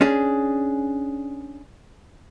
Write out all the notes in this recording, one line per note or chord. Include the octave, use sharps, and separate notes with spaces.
C#4 D4 G#4